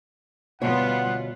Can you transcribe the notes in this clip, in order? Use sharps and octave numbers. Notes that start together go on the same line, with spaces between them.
D2 B2 G3 B3 F4 C#5 F#5